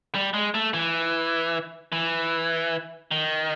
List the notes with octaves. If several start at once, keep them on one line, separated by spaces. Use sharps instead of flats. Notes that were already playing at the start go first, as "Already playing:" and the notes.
G3
G#3
A3
E3
E3
D#3